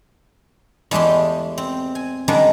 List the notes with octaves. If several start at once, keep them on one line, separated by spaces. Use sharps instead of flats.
E2 G#3 A3 G4 C6
C4
G#5
D3 D#3 G3 G#3 D4